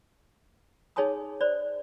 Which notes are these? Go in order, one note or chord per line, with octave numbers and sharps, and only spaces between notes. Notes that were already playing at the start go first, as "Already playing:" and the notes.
D#4 G#4 C#5 G#5 A5 D#6
C5 D5